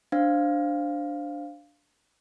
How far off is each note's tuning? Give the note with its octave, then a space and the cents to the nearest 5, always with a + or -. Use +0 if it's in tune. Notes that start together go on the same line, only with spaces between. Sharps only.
D4 +0 C5 +0 F5 +0